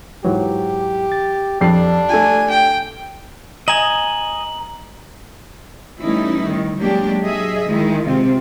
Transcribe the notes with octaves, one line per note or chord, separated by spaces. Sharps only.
G#2 E3 F#3 G4
A6
F2 D4 G4 D5 A5 C7
A3 F4 G#5
G5
D#5 G#5 A#5 F#7
E3 G3 A3 C#4 D#4 E4
D#3
F#3 G#3 A#3 D4 G4
F#3 G#4 D#5 E5
D#3 G#3 E4
C3 G#3 C4 F4